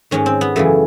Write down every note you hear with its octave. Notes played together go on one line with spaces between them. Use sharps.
G#2 D#3 C#4
C4
B3
F#2 C#3 E3 A3